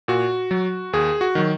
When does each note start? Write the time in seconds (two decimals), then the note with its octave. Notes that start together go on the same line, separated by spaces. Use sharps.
0.08 A#2 F#4
0.51 F#3
0.93 D#2 G#4
1.21 F#4
1.35 D#3 F#3